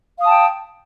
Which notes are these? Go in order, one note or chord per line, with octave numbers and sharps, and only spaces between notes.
F5 G5 A5 D#6